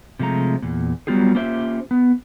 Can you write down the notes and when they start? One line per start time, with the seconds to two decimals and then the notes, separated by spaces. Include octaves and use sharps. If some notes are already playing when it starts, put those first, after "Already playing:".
0.19 C3 F3 G#3 A3 A#5
0.62 E2 A#2
1.07 F#3 G3 B3 F4 G4 G#4
1.35 A#3 C#4 F4 G4 C5 E5
1.91 B3